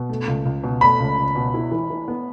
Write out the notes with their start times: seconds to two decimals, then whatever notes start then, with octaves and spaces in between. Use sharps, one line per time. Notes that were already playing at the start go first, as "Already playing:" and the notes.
Already playing: B2
0.09 A3
0.28 C#2
0.45 C#2
0.64 B2
0.81 A3 B5
1.00 C#2
1.17 C#2
1.36 B2
1.54 E4
1.71 E3
1.90 E3
2.08 B3